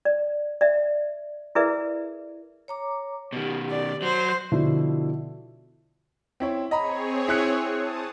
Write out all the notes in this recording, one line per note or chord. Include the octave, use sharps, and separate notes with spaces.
D5
D5 E5
E4 G#4 A#4 B4 D5 E5
C#5 A#5 D6
B2 D#3 G4
D5
F#3 C5
B2 D3 F3 E4
C4 E4 C#5
C4 G#4 C#5 D#5 A#5 B5
E4 F#6 C#7
A5 D#6